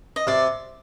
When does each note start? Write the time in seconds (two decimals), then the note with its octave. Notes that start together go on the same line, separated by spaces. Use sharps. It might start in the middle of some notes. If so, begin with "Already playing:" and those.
0.16 D#5
0.27 C3 D5